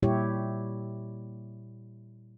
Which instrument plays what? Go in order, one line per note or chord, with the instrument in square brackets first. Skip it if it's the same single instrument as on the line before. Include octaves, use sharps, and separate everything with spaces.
[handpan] A#2 G3 E4 G4 C#5